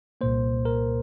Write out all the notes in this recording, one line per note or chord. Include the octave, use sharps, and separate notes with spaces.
C2 A#2 A#3 C5
A#4